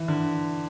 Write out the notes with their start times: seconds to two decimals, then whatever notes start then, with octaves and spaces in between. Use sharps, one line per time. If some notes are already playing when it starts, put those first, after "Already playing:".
Already playing: E3
0.08 D3